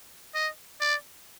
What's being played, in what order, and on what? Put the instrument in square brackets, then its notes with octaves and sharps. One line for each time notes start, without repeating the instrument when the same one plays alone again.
[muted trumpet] D#5
D5